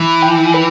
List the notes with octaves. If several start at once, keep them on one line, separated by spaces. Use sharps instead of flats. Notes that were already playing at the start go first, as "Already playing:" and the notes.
Already playing: E3
G5
B4